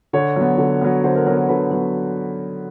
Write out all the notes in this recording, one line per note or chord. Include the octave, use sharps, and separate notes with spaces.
D3 C#5
F#3 B3
D3
F#3 B3
D3 C5
A#4
F#3 B3 A#4
A#4
D3 B4
F#3 B3